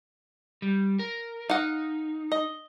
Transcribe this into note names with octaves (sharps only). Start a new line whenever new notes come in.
G3
A#4
D#4 F5 F#5
D#5